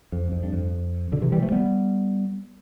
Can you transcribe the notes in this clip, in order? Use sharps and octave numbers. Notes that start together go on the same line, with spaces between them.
F2
F2
G2
F2
B2 D3
C3 E3
E3 G3
F3 A3
G3 B3